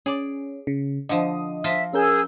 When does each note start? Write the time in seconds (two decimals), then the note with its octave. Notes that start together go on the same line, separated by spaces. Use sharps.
0.06 C#4 G#4 D5
0.67 C#3
1.09 D3 F3 D#5 D#6
1.64 F3 F4 D#5 E5
1.94 C#4 G#4 A#4 E6 G6